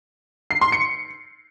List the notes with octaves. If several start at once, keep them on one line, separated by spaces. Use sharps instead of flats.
C7
C6
C#7